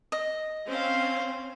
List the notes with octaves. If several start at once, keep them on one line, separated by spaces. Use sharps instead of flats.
D#5
C4 C#4 C5 F5